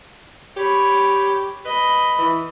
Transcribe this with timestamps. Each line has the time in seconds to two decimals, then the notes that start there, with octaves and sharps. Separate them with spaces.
0.57 G4 C#5 B5
1.65 B4 D#5 B5
2.19 E3